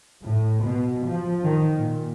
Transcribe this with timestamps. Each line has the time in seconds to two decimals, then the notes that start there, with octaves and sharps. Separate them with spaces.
0.22 A2
0.64 B2
1.05 F3
1.44 D#3
1.77 A#2